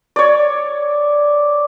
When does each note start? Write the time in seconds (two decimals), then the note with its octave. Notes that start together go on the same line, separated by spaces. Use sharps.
0.16 C#5 D5